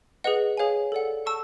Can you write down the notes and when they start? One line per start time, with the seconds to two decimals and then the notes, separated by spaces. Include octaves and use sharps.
0.24 G#4 B4 D#5 F#5
0.57 G#4 C#5 F5 G#5
0.92 A4 D5 F#5
1.25 F#5 A5 C#6 E6